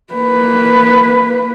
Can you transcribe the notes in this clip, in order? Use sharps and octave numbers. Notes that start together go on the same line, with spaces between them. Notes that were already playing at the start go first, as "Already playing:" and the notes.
A#3 B4